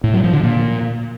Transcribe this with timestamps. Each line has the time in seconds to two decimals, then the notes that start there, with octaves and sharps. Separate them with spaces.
0.04 A2
0.14 F#3
0.23 F3
0.33 D3
0.43 A#2